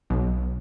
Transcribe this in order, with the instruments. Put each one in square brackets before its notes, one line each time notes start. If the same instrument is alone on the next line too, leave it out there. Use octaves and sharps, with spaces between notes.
[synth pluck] B1